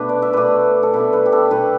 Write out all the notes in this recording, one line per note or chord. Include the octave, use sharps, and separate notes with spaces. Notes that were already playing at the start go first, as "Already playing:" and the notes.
Already playing: B2 A3 D4 B4
D5
E5
B2 A3 D4 B4 D5
A4
B2 A3 D4 B4
B4
G4
A4
B2 A3 D4 B4